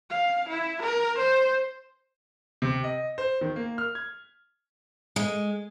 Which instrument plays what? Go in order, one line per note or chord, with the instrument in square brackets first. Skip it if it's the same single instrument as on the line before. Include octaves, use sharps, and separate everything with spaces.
[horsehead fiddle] F5
E4
A#4
C5
[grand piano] C3
D#5
C5
D#3
A#3
F6
G#6
[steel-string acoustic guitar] G#3